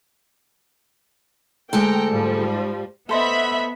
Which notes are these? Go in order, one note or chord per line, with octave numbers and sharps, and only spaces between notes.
D2 G#3 A4 G5 A#5
G#2 F3 G3
B3 A4 C5 D#5 E5 B5